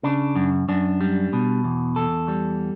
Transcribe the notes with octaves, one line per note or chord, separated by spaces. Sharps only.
C#3 D4
F#2
F#2 D4
G3
B2
E2
E2 A4
G3